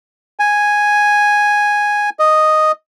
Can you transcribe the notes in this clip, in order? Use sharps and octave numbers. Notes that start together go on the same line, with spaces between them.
G#5
D#5